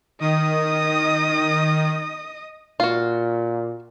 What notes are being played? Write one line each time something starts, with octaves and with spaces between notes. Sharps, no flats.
D#3 D#5 D#6
A#2 F4 F#4